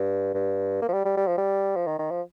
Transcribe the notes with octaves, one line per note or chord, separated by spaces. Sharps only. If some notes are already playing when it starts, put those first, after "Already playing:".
Already playing: G2
G2
A#3
F3
G3
G3
G3
F3
G3
F3
D#3
D#3
F3